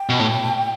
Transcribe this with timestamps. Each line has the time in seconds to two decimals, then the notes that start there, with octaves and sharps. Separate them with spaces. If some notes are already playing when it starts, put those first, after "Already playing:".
Already playing: G5
0.09 B2
0.19 A2